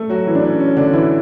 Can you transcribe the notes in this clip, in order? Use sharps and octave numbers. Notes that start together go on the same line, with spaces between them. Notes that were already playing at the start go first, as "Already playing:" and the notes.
Already playing: A3 A4
F#3 F#4
E3 E4
D4
C#4
C#4
D3 D4
E3 E4